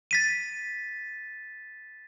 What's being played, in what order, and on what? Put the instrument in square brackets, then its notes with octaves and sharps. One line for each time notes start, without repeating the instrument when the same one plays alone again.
[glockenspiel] A6 B6 D#7